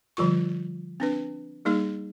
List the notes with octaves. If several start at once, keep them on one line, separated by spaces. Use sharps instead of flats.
D3 F3 G3 F4 C#6
C4 D4 B4
G3 A#3 D#4 G#4